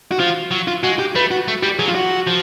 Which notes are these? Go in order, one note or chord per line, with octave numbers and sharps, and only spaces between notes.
F#4
F3 F4
F#3
F4
G#3 F#4
G4
A3 B4
F#4
A3
G3 G4
F#3 G#4
F4
F#4
F3